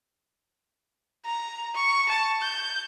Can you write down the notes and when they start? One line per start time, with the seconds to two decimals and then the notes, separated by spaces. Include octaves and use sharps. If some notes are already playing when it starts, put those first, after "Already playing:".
1.25 A#5
1.74 C#6
2.09 A5
2.41 G6